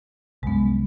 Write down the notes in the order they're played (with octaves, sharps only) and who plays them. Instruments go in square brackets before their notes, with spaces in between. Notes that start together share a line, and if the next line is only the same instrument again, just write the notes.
[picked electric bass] C2 F#2 [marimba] G#3 B3